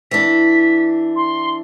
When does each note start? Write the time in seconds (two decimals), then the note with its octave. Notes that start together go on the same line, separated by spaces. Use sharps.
0.11 E3 D4 B6
1.16 C6